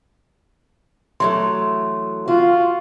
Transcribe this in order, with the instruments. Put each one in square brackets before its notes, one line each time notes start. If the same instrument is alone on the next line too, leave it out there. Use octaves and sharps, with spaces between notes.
[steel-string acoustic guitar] E3 F#3 A3 [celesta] C6
[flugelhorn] F4 [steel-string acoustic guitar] F#4